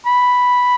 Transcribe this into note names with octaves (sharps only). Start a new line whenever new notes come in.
B5